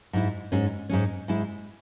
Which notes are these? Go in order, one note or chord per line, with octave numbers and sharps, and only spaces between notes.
G#2 G#3 E4
G#2 G#3 C#4
G#2 G#3 C#4
G#2 G#3 E4